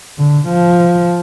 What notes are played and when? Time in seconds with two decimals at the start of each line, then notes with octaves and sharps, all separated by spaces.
0.19 D3
0.48 F3